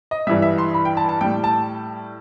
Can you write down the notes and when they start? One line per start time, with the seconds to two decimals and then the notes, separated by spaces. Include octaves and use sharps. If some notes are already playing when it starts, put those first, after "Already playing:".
0.11 D#5
0.27 G2 E3 G3 E5
0.42 E5
0.58 C6
0.74 B5
0.85 G5
0.97 A5
1.09 A5
1.21 A2 G3 G5
1.44 A5